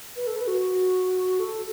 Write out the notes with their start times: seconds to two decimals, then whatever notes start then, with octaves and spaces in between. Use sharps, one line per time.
0.16 B4
0.27 A4
0.36 B4
0.47 F#4
1.39 A4